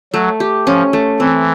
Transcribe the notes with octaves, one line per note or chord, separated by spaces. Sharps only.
F#3 A3
G4
F3 C#4
A3
E3 C4